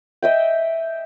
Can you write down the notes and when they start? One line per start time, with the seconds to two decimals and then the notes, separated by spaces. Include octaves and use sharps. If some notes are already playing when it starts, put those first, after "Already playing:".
0.22 D#5 E5 G5